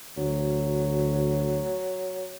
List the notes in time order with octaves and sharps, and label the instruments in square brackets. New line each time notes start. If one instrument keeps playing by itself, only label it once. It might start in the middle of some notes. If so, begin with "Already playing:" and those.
[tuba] D2 [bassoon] F#3